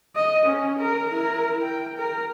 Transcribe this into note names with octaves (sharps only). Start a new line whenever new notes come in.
D#5
C#4
A#4
E4 A#4
G5
A#4